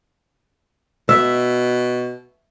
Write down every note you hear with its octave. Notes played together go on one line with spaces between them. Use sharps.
B2 E5